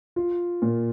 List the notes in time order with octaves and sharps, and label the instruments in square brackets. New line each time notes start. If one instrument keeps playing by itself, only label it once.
[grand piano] F4
A#2